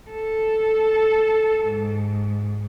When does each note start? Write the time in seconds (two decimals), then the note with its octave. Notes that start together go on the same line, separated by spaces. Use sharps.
0.10 A4
1.67 G#2